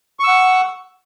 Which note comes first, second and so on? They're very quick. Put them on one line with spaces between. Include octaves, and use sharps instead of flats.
C#6 E6 F#5